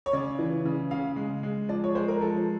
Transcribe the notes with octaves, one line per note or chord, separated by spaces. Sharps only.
C#5
C#3 D5
E3
C#3
C#3 F5
G#3
G#3
F3 D5
C#5
G#3 C5
A#4
F3 A4